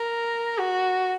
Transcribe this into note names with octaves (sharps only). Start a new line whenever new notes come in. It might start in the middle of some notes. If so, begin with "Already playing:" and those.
Already playing: A#4
F#4